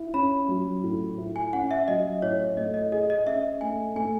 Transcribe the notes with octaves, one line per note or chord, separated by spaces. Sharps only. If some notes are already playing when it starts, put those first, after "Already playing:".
Already playing: E4
C#4 B5
F#3
A2
E4
G#5
C#4 F#5
E5
F#3 D#5
A2 C#5
A3 D#5
D#5
G#4 D#5
D#5
C#4 E5
A3 G#5
A3 G#5